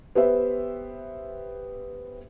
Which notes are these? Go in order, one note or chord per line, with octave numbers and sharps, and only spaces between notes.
B3 G4 B4 C5 E5